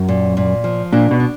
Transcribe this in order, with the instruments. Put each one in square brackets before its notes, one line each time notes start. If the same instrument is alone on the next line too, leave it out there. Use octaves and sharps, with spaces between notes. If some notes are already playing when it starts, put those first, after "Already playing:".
Already playing: [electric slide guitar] F#2
[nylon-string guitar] A#2
A#2
F3
[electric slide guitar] A#2 [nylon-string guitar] D4
[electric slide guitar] B2
[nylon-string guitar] D4